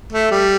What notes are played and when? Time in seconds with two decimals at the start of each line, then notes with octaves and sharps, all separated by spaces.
0.12 A3
0.31 G3